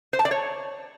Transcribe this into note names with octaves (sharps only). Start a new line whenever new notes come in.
C5
A5
D5
C#5